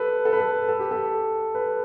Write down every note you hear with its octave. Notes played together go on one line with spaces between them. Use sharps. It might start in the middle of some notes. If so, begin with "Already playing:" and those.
Already playing: G4 A4 B4
A4
B4
A4
A4
G4
A4
B4